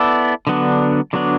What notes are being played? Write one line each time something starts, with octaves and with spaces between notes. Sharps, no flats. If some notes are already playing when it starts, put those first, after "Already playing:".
Already playing: B3 E4 A4 D5
D3 F#3 B3 D4
D3 F#3 B3 D4